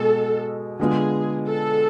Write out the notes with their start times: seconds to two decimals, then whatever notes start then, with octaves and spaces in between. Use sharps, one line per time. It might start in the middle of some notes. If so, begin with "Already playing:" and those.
Already playing: B2 G#3 A4
0.80 D3 G#3 B3 F4 G#4
1.48 A4